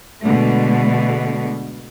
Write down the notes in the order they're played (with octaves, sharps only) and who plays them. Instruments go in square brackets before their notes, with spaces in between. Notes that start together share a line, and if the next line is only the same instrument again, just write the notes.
[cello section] B2 D3 G#3 A3